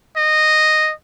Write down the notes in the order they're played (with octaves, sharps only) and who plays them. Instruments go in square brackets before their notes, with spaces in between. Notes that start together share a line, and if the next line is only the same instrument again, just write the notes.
[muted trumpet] D#5